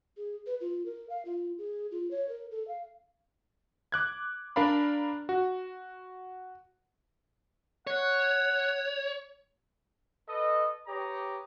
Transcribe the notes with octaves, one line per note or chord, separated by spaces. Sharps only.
G#4
B4
F4
A#4
F5
F4
G#4
F4
C#5
A#4
A4
F5
D6 F#6 G#6
D4 A#4 D5 F5 B5
F#4
C#5 F#5
A4 B4 D#5
G4 B4 C#5 A#5 D#6